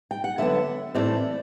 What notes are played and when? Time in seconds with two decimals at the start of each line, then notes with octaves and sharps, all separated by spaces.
0.11 G5
0.24 F#5
0.38 D3 F#3 B3 E5
0.95 A2 E3 A3 C4 D5